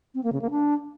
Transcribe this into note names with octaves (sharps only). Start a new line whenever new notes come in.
C4
A#3
C#3
A#3
D4